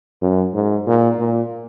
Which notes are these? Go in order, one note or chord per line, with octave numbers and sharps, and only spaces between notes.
F#2
G#2
A#2
A#2